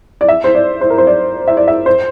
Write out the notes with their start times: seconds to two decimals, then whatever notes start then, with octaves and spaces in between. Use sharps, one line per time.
0.21 D5
0.28 E5
0.44 C5
0.55 D5
0.81 C5
0.90 A#4
0.98 C5
1.07 D5
1.48 E5
1.57 D5
1.68 E5
1.86 C5